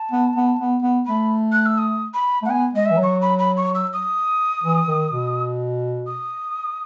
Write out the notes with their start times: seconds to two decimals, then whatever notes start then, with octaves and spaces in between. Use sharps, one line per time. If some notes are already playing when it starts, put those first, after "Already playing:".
Already playing: A5
0.11 B3
0.36 B3
0.59 B3
0.83 B3
1.06 A3 B5
1.52 F#6
1.66 E6
1.78 D#6
2.14 B5
2.43 A3
2.45 F#5
2.49 B3 G#5
2.73 G#3 D#5
2.86 E5
2.91 E3
2.97 F#3
3.03 C#6
3.22 B5
3.39 B5
3.57 C#6
3.75 E6
3.93 D#6
4.64 E3
4.88 D#3
5.11 B2
6.07 D#6